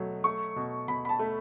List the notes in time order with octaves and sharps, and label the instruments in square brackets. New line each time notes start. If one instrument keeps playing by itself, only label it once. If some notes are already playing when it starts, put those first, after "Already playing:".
Already playing: [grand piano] B2 F#3 A3
A3 C#6
B2
B2 B5
B5
A5
A3